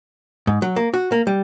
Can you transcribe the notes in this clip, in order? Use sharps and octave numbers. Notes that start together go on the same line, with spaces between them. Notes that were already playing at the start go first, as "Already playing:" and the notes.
G#2
F#3
A#3
F#4
A#3
G3